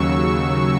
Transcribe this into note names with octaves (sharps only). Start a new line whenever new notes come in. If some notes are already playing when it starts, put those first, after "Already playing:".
Already playing: D#2 C#3 F#3 C#6 E6